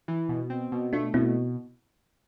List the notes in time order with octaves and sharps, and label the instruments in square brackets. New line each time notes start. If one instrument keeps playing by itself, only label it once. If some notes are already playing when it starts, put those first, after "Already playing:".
[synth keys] E3
B2
C4
B2
[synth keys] A3 [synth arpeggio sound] D4 F4
[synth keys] B2 [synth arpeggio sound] C4 E4